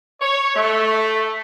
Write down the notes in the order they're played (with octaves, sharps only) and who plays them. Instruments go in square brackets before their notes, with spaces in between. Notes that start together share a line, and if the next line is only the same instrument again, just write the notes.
[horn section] C#5
A3